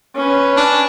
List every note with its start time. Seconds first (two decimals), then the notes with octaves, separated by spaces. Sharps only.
0.16 C#4 B4 C#5
0.57 D4